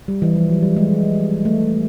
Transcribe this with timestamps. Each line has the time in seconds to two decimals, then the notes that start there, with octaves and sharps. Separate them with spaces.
0.08 G3
0.22 E3
0.36 F3
0.49 F#3
0.63 G3
0.76 G#3
1.45 A3